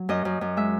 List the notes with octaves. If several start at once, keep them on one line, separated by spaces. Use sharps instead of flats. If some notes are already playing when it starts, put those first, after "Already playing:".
Already playing: F#3
F#2 D#5
F#2
F#2
G#3 E5